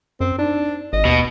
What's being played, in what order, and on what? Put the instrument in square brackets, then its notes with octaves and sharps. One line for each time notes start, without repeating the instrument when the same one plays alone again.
[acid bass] F#2 [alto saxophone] C4
[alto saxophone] D4 [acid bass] D#4
[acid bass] G#1 [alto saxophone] D#5
[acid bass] D#2 [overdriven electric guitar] B2